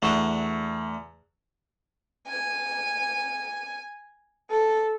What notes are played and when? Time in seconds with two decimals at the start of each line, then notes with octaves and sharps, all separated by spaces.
0.02 E2 A3 D4 F#4 C#6 E7
2.27 G#5
4.50 A4